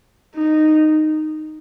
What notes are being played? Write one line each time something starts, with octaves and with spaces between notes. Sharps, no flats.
D#4